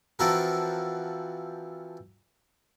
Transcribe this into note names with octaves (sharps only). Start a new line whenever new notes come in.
E3 F3 C4 F#4 A4 A#4